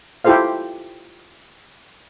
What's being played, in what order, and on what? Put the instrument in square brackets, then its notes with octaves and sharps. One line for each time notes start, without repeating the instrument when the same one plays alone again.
[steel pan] E4 F4 G4 A4 C5 F5